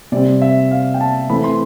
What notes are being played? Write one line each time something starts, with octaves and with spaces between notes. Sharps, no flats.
C3 G3 C4 D5
E5
F5
G5
A5
E3 A3 C4 B5
C6